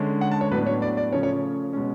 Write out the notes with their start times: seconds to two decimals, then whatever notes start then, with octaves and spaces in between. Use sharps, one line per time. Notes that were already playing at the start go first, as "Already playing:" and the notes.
Already playing: D3 G#3 C#4
0.21 F#5
0.31 A5
0.41 C#5
0.51 A2 F#3 B3 D4 B4
0.67 C#5
0.82 D5
0.97 D5
1.12 C#3 F3 A3 C#4 C#5
1.23 C#5
1.73 B2 G#3 C#4